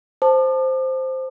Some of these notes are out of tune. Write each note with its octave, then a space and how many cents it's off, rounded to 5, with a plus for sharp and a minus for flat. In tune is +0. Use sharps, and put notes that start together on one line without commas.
C5 +0 A5 +0 D6 +45